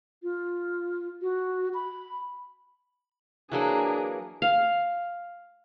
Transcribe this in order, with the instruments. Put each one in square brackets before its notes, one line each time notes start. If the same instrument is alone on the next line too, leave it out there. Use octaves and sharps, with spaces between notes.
[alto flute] F4
F#4
B5
[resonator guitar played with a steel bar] E3 F#3 A#3 [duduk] D4 [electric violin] G#4
[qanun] F5